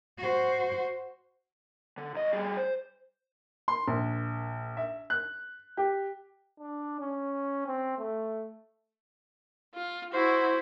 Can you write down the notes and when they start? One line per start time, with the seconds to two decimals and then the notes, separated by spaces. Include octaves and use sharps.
0.18 F#4 C5
1.98 D3
2.14 C2 D#5
2.33 G3 G#4
2.57 C5
3.68 C6
3.88 A#1
4.77 E5
5.10 F#6
5.77 G4
6.60 D4
7.00 C#4
7.67 C4
7.98 A3
9.75 F4
10.14 E4 F#4 C5